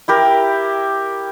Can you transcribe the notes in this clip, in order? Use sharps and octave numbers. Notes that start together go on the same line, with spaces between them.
E4 G4 A#4